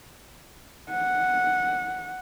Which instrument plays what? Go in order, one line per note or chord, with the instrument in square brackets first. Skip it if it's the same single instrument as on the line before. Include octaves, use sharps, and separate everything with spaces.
[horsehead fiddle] F#5